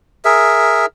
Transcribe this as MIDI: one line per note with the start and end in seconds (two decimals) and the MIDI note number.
0.25 0.86 68
0.25 0.86 70
0.25 0.86 76